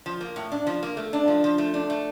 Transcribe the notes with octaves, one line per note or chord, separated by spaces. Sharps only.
F3
A#3
A2
D4
F3
A#3
A3
D4
F3
F3
A3
D4
A3